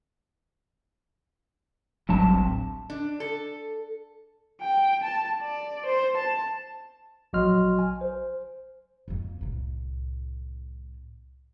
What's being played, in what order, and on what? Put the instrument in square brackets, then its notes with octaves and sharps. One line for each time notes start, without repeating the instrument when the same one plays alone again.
[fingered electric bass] D1 A1 F#3 [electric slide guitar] G2 C3 A5
[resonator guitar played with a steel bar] D4
A4
[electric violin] G5
A5
D5
C5
A5
[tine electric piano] A#1 F#3 F#4 D#5 C6 F6
G#5
C5
[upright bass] F2 A#3
C2 A2